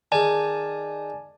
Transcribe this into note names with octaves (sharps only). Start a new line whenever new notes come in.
D#3 G#4 D5 G#5 A5